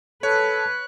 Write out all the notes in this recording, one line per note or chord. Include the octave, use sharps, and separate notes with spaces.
A4 B4 C#5 F#6